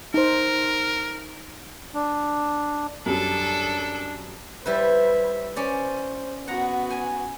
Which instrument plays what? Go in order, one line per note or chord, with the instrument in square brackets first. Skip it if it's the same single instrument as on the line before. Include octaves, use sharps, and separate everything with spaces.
[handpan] D#4 C5 [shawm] A#4
[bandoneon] D4
[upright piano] F#2 G3 [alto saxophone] D4 [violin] A4
[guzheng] G3 E4 B4 [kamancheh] C5 E5
[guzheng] C#4 D5 [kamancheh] C5
[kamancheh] B3 F#4 [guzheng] F#5 A#5
[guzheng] G#5